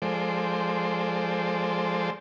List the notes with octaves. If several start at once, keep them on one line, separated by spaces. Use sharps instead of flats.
F3 G#3 A4 C5 D5